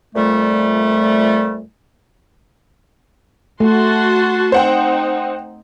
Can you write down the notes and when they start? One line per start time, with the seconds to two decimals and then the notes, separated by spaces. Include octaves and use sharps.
0.15 F2 A#2 G3 A3
3.60 A3 F#4 A5 C6
4.52 C4 D#4 C5 F#5 G5